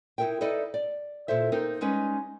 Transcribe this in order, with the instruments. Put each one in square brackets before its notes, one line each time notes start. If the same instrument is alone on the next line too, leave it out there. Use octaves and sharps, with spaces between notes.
[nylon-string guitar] D#4 E4 A4 A#4 E5 G5
D#4 E4 A4 B4 D5 D#5
D5
A#2 E4 A4 C5 E5
A#3 C4 D#4 A4 A#4
G3 G#3 C#4 D#4 B4 D#5